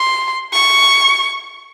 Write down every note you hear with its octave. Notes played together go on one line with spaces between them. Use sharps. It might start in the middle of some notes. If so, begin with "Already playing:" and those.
Already playing: C6
C#6